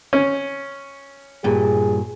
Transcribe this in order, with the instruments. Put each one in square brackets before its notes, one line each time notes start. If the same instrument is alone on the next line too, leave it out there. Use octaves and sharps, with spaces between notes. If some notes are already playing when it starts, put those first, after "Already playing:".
[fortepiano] C#4
[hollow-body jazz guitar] G2 A#2 [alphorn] G#4